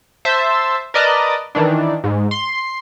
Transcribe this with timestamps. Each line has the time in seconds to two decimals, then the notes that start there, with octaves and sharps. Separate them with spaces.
0.25 C5 E5 A5
0.94 A#4 B4 D5 D#5 A5
1.55 D#3 E3 D4
2.04 G#2
2.31 C6